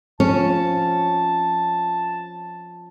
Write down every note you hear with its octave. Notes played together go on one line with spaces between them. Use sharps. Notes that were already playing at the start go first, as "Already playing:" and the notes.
F3 C#4 A5